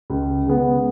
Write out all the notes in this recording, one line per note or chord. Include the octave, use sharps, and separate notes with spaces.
C#2
C#3 G#3 B3